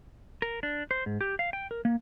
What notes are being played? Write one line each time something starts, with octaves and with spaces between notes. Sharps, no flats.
A#4
D4
C5
G#2
G4
F5
G5
A#4
A#3